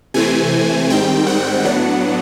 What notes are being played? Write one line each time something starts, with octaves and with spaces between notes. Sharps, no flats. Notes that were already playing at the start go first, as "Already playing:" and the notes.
C3 E3 A3 C4 G#5
G#2 D#3 G3 C4 G5
F#5
A2 F#3 B3 D4 F#5